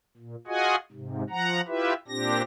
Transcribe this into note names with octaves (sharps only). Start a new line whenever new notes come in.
A#2
F4 F#4 G#4 D#5 F#5 G#5
G#2 C3
F3 F#5 A#5
E4 F4 G4 B4 E5
A#2 C4 D4 G4 A#6